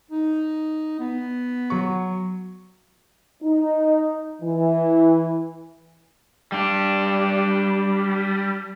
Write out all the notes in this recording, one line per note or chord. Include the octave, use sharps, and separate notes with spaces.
D#4
B3
F#3 C#6
D#4
E3
G3 D4